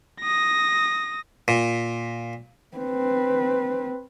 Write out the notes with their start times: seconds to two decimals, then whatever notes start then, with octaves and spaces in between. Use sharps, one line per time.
0.21 D#6 A#6
1.48 A#2
2.78 C4 B4